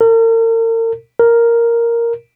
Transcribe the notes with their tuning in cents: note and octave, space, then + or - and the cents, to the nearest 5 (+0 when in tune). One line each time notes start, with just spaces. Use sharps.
A#4 -40
A#4 +0